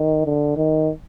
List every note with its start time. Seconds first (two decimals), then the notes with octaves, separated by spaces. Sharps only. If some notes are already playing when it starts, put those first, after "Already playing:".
Already playing: D#3
0.25 D3
0.57 D#3